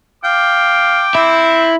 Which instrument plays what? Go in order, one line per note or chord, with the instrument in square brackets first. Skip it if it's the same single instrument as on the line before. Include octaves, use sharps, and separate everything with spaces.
[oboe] F5 [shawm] G5 [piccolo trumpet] D6
[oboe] C4 [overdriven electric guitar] E4